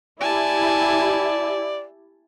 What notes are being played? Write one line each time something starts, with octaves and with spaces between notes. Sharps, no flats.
E4 G4 D5 G#5 A5